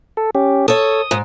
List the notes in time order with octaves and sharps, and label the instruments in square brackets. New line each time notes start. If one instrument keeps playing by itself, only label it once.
[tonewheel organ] A4
C#4 G4
[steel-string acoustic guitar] A4 C#5 [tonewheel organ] D#6
[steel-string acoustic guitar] G#2